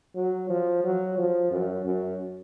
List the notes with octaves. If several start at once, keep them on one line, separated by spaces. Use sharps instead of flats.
F#3
F3
F#3
F3
F#2
F#2